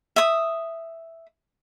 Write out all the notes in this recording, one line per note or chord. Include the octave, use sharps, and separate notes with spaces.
E5 D#6